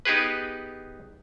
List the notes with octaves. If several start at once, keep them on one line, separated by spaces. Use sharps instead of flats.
B3 D#4 G4 G#4 B4